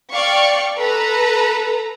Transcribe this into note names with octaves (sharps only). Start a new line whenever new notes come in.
D5 F5 G5 C#6
A4 B4 A#5